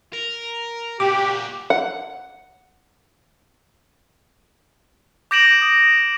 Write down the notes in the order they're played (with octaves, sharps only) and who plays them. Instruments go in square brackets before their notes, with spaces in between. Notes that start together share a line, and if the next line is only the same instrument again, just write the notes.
[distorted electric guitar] A#4
[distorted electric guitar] A#2 F#4 [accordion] G4 [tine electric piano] D6
[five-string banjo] F#5
[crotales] D6 G6 A#6 D7 E7 F#7
D#6